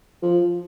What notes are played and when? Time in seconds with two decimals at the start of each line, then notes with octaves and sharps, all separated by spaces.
0.22 F3